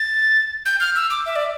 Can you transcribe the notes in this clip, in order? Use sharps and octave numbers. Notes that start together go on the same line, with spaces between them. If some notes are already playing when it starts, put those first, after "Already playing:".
Already playing: A6
G6
F6
E6
D6
E5
D5